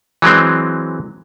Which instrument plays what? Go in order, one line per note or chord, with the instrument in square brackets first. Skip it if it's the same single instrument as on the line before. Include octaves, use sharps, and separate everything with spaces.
[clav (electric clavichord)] E3 F#3 G#3 C4